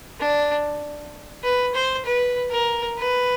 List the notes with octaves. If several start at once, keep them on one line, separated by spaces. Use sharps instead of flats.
D4
B4
C5
B4
A#4
B4